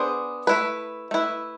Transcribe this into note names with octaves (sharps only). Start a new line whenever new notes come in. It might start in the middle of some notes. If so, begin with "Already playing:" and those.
Already playing: B3 D4 G#4 C5
A3 E4 B4
A3 E4 B4